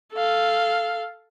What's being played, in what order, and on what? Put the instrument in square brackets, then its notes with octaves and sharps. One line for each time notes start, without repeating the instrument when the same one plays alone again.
[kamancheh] A4 F5